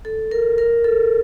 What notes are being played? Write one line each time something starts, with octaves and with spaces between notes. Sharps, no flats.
A4
A#4
A#4
A4